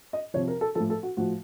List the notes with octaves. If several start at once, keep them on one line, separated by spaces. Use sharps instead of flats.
D#5
C3 F3 C#5
A#4
A4
A2 F3 A4
A4
F#4
A2 F3 F#4